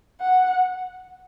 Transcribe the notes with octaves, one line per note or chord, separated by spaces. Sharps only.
F#5